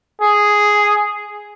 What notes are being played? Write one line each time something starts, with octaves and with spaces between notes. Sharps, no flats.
G#4